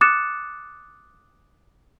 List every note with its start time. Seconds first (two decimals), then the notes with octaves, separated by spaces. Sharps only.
0.01 D6 D#6 F#6 A6 C#7 E7